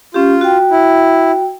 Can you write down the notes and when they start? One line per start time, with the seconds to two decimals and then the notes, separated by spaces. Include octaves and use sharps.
0.14 C#4 F4 G4
0.41 F#4 G5
0.71 E4